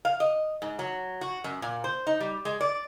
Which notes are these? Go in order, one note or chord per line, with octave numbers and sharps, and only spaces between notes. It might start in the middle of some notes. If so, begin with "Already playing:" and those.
F5
D#5
G#2
F#3
F#4
F#2
A#2
C5
D#4
G3
G#3
D5